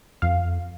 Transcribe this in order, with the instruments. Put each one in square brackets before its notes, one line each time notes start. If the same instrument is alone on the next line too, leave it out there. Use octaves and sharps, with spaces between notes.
[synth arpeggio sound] F2 F5